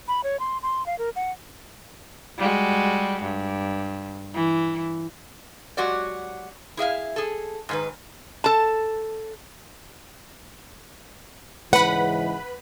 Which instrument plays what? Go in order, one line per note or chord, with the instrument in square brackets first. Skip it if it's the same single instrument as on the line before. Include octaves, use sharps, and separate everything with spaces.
[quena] B5
C#5
C6
C6
F5
A#4
F#5
[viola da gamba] G3 G#3 F#4
G2
E3
[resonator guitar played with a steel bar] F#3 G#3 F#4 G4 D5
E4 G#4 E5 F5
G#4 A4
G#2 D#3 B4
A4 A5
[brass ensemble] G#2 C#3 E3 [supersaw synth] B4 B5 [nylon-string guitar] F#5